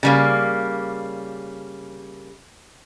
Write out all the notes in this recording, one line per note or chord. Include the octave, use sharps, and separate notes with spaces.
C#3 G3 A#3